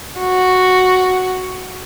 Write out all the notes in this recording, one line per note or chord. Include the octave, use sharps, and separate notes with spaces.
F#4